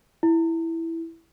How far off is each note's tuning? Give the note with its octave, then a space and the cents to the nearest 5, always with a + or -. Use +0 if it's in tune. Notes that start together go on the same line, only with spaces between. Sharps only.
E4 +0